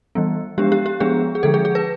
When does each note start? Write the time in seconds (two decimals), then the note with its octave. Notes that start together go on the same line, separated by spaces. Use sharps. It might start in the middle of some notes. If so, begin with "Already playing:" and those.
0.15 E3 G3 B3
0.58 F3 G#3 B3 D4 G4
0.72 G4
0.86 G4
1.00 F3 G#3 B3 D4 G#4
1.35 G#4
1.43 D3 F3 G#3 A4
1.54 G#4
1.65 G#4
1.75 B4